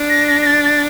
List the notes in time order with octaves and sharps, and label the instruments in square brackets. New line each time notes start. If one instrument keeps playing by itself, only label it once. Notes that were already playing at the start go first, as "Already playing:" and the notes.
Already playing: [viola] D4
[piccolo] A#6
A#6
A#6
A6
A6